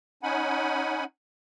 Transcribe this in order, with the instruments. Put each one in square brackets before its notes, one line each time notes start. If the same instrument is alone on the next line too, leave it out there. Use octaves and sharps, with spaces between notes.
[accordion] C#4 D#4 F#5 G#5 B5